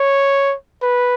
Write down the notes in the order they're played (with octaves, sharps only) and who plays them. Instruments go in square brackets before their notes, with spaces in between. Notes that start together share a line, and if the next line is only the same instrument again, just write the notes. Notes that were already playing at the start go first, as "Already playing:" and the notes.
Already playing: [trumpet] C#5
B4